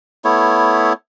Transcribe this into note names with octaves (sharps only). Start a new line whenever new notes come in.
A3 B3 E4 C#5